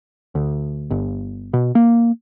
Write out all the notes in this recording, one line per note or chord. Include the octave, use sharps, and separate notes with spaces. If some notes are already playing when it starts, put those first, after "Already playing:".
D2
G1
B2
A#3